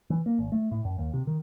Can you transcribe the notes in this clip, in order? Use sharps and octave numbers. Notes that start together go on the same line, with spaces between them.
E3
A#3
G#1
A3
A2
F#2
D#2
C3
D#3